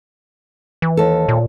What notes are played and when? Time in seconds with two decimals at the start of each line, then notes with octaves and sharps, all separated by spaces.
0.82 E3
0.97 D#2 A4
1.29 A#2